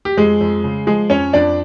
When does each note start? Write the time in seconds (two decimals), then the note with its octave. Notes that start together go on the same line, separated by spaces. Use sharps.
0.05 G4
0.17 F2 G#3 G#4
0.41 F2
0.64 C#3
0.87 F3 G#3 G#4
1.10 F2 C#4 C#5
1.33 F2 D4 D5